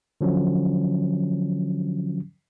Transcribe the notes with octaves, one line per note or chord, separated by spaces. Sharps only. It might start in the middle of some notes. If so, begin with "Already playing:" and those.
D3 F3 F#3 C#4